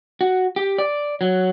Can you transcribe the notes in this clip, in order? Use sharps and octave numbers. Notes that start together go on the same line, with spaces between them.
F#4
G4
D5
F#3